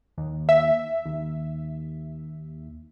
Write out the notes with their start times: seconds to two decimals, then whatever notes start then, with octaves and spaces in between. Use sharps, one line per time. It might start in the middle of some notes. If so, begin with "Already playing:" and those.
0.18 D#2
0.49 E5
1.06 D#2